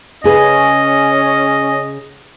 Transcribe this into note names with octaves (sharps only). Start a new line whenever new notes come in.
C#3 C#4 G#4 B4 D#5